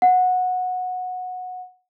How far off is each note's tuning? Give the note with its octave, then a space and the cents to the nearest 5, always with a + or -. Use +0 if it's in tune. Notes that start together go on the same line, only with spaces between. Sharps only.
F#5 -15